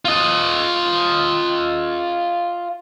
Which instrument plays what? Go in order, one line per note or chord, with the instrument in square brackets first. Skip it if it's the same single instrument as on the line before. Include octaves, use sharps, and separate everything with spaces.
[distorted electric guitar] F4 D#5